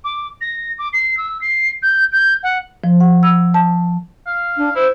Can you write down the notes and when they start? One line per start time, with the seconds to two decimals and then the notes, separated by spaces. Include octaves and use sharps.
0.04 D6
0.41 A#6
0.78 D6
0.93 C7
1.17 E6
1.41 C7
1.82 G6
2.12 G6
2.43 F#5
2.84 F3
3.00 F#5
3.23 E6
3.54 A5
4.26 F5
4.57 D4
4.75 E4 C5